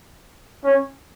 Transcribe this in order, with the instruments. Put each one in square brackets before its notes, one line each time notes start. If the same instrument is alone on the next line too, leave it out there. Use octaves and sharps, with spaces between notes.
[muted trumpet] C#4